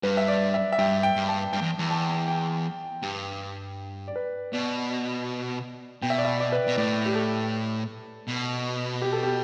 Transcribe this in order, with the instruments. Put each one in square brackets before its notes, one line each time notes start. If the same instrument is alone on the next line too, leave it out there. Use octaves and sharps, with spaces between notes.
[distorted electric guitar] G2 [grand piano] B4
[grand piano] E5
D5
E5
E5
[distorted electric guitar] G2 [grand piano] G5
[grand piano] G5
[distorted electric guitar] G2
[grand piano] A5
[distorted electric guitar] G2 [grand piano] G5
[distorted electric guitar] E2
E2
[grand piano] A5
G5
[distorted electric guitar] G2
[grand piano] D5
B4
[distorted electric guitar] B2 [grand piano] D5
[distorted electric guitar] B2 [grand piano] G5
[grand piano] E5
D5
E5
D5
B4
[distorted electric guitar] B2 [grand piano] D5
[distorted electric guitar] A2 [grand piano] D5
[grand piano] G4
A4
[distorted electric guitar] B2
[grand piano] G4
A4
G4